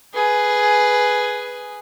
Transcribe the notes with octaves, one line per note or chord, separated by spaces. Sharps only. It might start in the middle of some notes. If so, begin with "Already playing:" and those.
G#4 B4